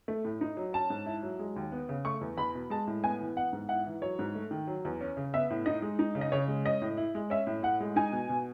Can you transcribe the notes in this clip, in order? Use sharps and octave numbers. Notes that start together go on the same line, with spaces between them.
A3
A2
D#4
F#3
C#4 A5
G#2
E4
F#3
G#3
D#2
B3
C#3
A3 C#6
E2
E2 B5
B2
G#3 A5
A2
B3 G#5
E3
B3 F#5
G#2
E4 F#5
E3
F#3 C#5
G#2
A3
D#3
F#3
E2
C#4
C#3
B3 E5
A2
D#4 D#5
G#3
D#4
C#3
D#5
C#3 C#5
G#3
C#4 D#5
A2
E4
G#3
C#4 E5
A2
A2 F#5
G#3
D#4 G#5
B2
B2